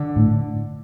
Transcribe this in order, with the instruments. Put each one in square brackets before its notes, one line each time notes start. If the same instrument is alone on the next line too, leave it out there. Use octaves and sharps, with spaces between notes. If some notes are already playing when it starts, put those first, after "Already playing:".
Already playing: [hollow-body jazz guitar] D3
[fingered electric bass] A2